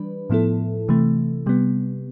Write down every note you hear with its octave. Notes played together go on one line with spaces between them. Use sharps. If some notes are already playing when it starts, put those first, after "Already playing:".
Already playing: E3 G3 D4 B4
A2 F3 B3 E4 A4
C3 E3 A3
C3 G3 B3